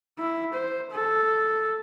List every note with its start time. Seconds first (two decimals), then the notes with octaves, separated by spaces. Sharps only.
0.19 E4
0.54 C5
0.92 A4